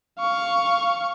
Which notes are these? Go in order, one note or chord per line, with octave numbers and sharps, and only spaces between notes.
F5 C#6